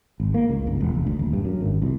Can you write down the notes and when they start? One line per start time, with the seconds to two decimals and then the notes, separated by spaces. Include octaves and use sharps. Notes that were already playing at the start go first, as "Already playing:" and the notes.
0.20 G#1
0.34 A#3
0.49 C#2
0.67 G1
0.81 E1
0.95 F1
1.07 D2
1.19 D#1
1.33 G2
1.45 F#2
1.61 G#1
1.82 C2